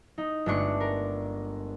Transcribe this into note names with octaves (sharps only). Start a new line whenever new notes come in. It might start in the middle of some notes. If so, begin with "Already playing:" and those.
D#4
G1 G#3 A3 D4 C#6
A#4